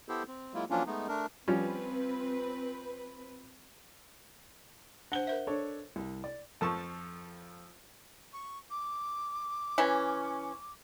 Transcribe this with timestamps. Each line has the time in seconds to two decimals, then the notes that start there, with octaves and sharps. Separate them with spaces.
0.09 B3 E4 G4 A4 C5
0.28 C4
0.54 F#3 G#3 A#3 E4 F4
0.70 F3 F#3 A#3 C#4 D4 F4
0.86 G#3 A3 B3 D#4
1.08 A3 D4 A#4
1.48 F3 G3 C4 C#4 B4
5.12 D4 C5 F#5 G7
5.27 A#4 C5 E5
5.47 D4 A4 C#5
5.96 C2
6.24 D5
6.61 F2 F3 A4 A5 C#6
8.33 C#6
8.70 D6
9.78 E3 C#4